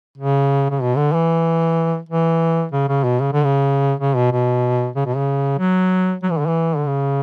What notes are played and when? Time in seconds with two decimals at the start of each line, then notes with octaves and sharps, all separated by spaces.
0.18 C#3
0.70 C#3
0.81 B2
0.97 D3
1.13 E3
2.09 E3
2.72 C#3
2.88 C#3
3.04 B2
3.20 C#3
3.33 D3
3.44 C#3
4.00 C#3
4.15 B2
4.31 B2
4.96 C#3
5.06 B2
5.16 C#3
5.59 F#3
6.23 F#3
6.31 E3
6.39 D3
6.47 E3
6.77 D3
6.87 C#3